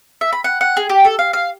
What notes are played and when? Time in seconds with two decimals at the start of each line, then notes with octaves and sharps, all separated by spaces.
0.21 E5
0.33 B5
0.44 F#5
0.61 F#5
0.77 G#4
0.89 G4
1.05 A4
1.19 F5
1.33 F5